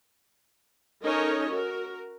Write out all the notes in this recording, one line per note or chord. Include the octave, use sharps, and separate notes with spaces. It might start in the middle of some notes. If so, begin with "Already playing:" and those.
C#4 D#4 A4 A#4 C#5 D#5
F#4 A#4